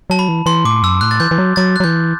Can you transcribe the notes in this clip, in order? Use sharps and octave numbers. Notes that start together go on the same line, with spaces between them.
F#3 A5
B5
E3
E3 C6
A2 D6
F#2 E6
A2 F#6
A6
E3 G6
E3
F#3
F#3 A6
F#6
F#3
E3 G6